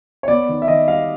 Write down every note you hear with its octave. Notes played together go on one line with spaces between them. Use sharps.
C#5
B3 D5
D#3
E5
D#3 D#5
G3 F5